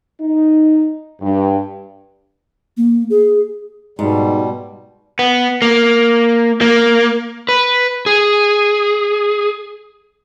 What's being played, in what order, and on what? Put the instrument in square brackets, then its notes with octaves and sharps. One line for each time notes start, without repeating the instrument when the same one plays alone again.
[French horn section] D#4
G2
[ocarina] A#3
G#4
[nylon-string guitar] G#2 [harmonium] B2 G3
[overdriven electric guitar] B3
A#3
A#3
[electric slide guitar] B4
G#4